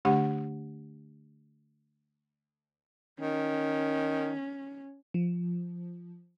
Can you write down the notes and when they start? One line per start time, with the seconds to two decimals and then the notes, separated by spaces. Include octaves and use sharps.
0.05 D3 A3 D4 G4 F#5
3.20 D#3 C#4
5.14 F3